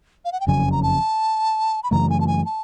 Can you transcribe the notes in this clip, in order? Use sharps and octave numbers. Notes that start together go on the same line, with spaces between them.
F5
F#5
G5
F#1 F2 C#3 F#3 G#5
A#5
A5
B5
F#2 C#3 E3 A3 A#5
G#5
A5
G#5
A5